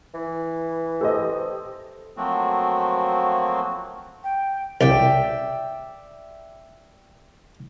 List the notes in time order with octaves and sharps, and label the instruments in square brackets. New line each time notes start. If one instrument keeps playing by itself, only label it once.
[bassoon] E3
[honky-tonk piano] G4 C5 D#5 [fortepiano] A4
[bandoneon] F3 F#3 A3 A#3 C4 F#4
[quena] G5
[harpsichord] C2 [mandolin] D5 E5 G5